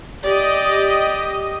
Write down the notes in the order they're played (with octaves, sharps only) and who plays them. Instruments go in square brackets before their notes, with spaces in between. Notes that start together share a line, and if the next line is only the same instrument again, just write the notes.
[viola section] G4 D#5 [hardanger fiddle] D5